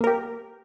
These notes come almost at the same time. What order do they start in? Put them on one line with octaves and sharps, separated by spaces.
A#3 A#4 G4